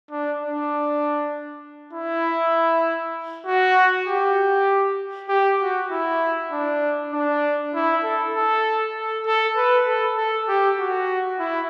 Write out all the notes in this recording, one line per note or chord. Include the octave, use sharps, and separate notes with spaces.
D4
D4
E4
F#4
G4
G4
F#4
E4
D4
D4
E4
A4
A4
A4
A4
B4
A4
A4
G4
F#4
E4